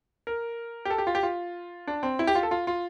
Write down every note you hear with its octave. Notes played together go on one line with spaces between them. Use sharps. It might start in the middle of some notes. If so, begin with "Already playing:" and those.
A#4
G4
A4
G4
F4
G4
F4
D4
C4
E4
G4
F4
A4
F4
F4